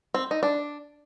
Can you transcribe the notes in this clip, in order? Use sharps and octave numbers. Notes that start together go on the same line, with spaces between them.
C4
D#4
D4